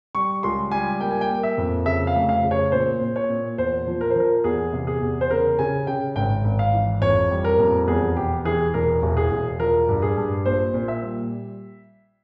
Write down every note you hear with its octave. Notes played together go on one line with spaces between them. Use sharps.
G3 C#6
C#2 C6
G3 G#5
A#3 G5
G#5
G5
A#3
E5
F2
C#3 E5
F5
F1
F5
C#3
C#5
A#2 C5
A#2
C#5
A#2
E2 C5
F3
A#4
C5
F3 A#4
E2 G#4
C3
G#4
E2
C5
C#3 A#4
C#3 G#5
C#3 G5
G#1 G5
G#1
F5
E3
F2 C#5
G3
A#4
F2
E2 G#4
E1 G4
E3 G#4
E1 A#4
E1
G#4
E1
F3 A#4
G2
G#4
G2
A#1 C5
A#2
E5
G3